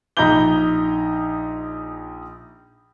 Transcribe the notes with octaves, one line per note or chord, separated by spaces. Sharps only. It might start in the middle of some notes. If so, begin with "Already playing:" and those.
A#1 D#4 A#5 B5 G6 G7